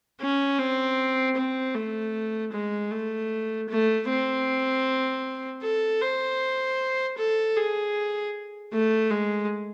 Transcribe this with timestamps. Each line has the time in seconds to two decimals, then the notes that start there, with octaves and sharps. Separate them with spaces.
0.21 C#4
0.58 C4
1.36 C4
1.75 A3
2.52 G#3
2.91 A3
3.69 A3
4.08 C4
5.63 A4
6.01 C5
7.18 A4
7.56 G#4
8.73 A3
9.11 G#3